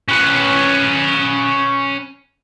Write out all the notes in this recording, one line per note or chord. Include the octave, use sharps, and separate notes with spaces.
C#4 B4